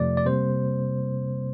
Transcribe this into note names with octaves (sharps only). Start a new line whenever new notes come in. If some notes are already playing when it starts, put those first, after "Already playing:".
Already playing: F2 C3 F3 A3 D5
D5
C3 G3 A#3 C5